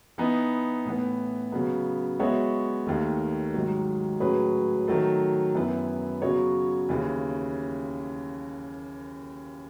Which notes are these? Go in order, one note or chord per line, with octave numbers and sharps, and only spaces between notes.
E3 B3 D#4
A2 E3 B3
C#3 F#3 B3
G#3 B3 F#4 C#5 E5
D#2 D#3 A3
G#2 D#3 F#3
A2 F#3 C#4 G#4 B4
D#3 F#3 A3
F#2 E3 B3 E4 B4
C#3 F#3 B3 F#4 C#5
D#2 C#3 E3